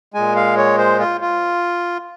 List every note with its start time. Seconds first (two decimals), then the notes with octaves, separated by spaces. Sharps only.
0.14 A#2 G#3 G#5
0.36 F5
0.57 C#5
0.78 C5
0.99 F4
1.21 F4